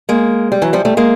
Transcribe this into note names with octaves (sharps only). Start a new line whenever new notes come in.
G#3 A#3
G3
E3 F#3
F3 G3
G3 A3
G#3 A#3